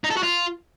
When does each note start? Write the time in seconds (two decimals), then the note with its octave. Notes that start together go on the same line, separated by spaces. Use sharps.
0.04 D#4
0.10 A4
0.17 F#4
0.23 F4